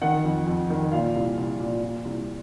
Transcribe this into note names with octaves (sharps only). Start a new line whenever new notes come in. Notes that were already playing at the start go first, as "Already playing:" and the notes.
D#3 F#5
F2
F2
D#3
A#2 F5
C2
C2
A#2
A#2
C2